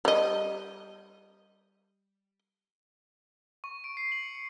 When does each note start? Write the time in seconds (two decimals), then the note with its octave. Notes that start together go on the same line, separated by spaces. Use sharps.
0.05 G3 D#5
3.64 C#6
3.84 D7
3.97 C7
4.12 F#7
4.23 C#7
4.35 C#7